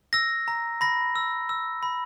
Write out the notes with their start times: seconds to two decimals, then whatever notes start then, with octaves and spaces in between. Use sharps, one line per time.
0.13 E6 A#6
0.48 A#5
0.81 B5 A#6
1.16 E6
1.49 E6
1.83 B5